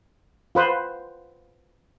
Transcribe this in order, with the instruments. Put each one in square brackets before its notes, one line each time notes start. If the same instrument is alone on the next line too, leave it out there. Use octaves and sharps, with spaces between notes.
[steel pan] F4 B4 C5